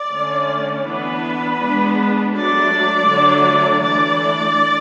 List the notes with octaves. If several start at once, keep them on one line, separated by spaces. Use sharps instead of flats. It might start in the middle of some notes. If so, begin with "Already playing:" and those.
Already playing: D5
D3 A3 C#4
E3 B3 D4 B4
G#3 B3 D4
F#3 A3 D4 D5
D3 F#3 A3 D4
E3 A3 D4 D5